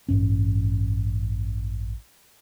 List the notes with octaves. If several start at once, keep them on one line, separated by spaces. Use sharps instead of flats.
A1 G2 C#4